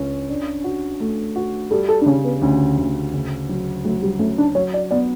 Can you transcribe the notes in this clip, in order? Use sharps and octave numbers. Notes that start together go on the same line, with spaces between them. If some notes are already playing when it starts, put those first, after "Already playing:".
Already playing: C#2 C#4
D4
F#4
A3
F#4
G3 A4
A4
D4
C#3 C#4
B3
D2 C#4
D2
C#3
F#3
F#3 A3
G3
A3 C#4
D4
F#3 C#5
D5
B3 D5